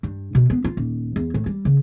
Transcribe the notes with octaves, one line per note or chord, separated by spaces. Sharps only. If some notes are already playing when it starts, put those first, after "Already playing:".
G2
B2
B3
F4
D#1
E2
A2
G3
C#3